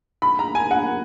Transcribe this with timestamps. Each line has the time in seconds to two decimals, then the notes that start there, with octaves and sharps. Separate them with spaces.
0.22 B5
0.39 A#5
0.55 G#5
0.71 F#5